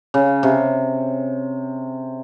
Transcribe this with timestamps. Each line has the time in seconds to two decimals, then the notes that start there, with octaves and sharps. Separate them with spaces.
0.14 C#3
0.43 C3